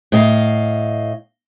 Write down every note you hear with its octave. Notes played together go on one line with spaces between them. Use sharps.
A2 D#5 F5